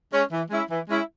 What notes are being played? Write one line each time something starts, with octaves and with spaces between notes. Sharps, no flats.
G#3 C#4
E3
G#3 C#4 E4
E3
G#3 C#4 E4